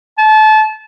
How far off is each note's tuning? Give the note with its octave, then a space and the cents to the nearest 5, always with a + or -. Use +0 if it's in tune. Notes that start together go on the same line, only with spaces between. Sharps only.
A5 -30